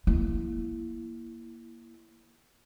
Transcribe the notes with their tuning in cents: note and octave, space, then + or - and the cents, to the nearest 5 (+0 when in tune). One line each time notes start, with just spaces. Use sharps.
A#3 +15 E4 +10